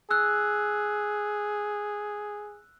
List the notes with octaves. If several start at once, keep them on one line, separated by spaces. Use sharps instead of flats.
G#4 E6 F#6